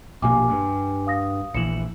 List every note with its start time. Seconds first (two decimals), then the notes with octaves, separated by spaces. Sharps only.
0.22 A#1 B2 A#3 G4 G#5 D6
0.50 G2
1.07 F5 D#6 A#6
1.54 A#1 E3 C#7 E7 F#7